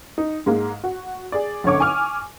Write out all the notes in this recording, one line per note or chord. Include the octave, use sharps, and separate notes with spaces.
D#4
G#2 G#3 A#3
F#4
G#4 D5
B1 D3 C#4 C#5 C#6 D6
G#5 C#6 D6 F6